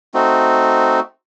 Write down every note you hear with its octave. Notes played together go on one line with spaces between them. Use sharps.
A3 C4 D#4 F#4